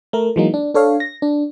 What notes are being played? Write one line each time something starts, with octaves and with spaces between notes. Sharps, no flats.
A3 A#4
E3 F#3 G#3 A#3 D#4
D4
D4 A4 C#5 F5
A#6
D4